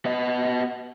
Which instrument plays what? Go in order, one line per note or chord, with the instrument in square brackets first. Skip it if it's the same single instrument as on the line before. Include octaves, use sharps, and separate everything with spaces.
[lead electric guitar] B3 D#5